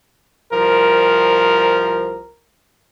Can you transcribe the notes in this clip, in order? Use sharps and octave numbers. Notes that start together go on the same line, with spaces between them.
C2 F3 A#4